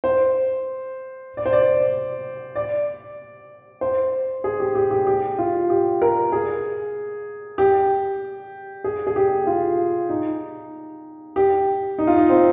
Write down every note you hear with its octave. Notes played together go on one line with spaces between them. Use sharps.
C5
D5
C5
D5
D5
C5
G#4
G4
G4
G4
G4
F4
G4
A#4
G#4
G4
G#4
G#4
G4
F4
D#4
G4
D#4
F4
D#4
C4